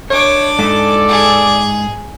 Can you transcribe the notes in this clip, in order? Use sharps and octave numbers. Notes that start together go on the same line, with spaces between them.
D4 C#5 D6
G#2 A4 D5
G#4